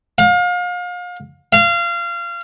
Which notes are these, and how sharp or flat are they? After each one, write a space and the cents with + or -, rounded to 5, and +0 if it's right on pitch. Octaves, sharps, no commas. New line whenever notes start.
F5 +35
F5 -25